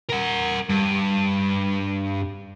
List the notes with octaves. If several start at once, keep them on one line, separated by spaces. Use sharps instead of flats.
A#4 F#5
G2